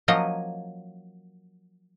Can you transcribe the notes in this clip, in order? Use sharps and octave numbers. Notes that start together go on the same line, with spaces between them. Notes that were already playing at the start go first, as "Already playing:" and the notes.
F3 F#3 A#3 C#4 D#5